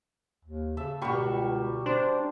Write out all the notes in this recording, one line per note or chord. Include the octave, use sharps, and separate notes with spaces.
D#2
C#3 A4 E5
C#2 B2 D3 G3 A#4 C#6
D4 C5